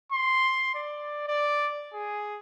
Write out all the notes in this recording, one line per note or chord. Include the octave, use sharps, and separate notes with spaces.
C6
D5
D5
G#4